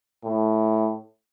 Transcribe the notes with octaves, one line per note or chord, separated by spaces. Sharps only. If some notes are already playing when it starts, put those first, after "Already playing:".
A2